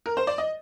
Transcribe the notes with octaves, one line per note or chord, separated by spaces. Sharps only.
A#4
C5
D5
D#5